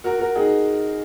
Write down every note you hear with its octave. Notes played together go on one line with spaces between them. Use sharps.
F#4 A#4
F#4 A#4
D#4 G#4